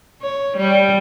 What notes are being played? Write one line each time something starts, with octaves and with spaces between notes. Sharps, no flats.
C#5
G3